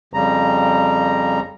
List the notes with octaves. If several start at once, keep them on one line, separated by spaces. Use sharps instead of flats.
F2 C#3 G3 A#5